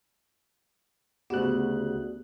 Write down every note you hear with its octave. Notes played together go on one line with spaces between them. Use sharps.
D2 C#3 B3 D4 F#4 G4 F#6